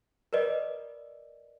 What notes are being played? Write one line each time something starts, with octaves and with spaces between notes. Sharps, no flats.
A#4 B4 D5 D#5